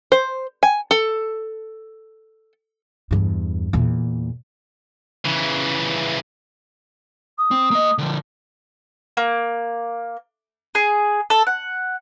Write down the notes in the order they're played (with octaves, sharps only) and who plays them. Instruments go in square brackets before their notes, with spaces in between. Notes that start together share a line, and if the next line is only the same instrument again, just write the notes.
[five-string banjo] C5
G#5
A4
[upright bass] E2 G2
E2 A#2
[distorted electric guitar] C#3 E3
[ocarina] D#6
[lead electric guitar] C4
A#3 D#5
D3 F3
[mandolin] A#3
G#4
A4
F#5